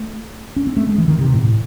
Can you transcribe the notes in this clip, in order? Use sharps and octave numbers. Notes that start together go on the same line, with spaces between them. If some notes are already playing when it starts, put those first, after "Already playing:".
Already playing: A3
C#4
C4
A3
G#3
E3
D#3
C3
A2